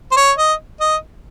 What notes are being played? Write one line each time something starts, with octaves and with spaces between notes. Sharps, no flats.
C5
C#5
D#5
D#5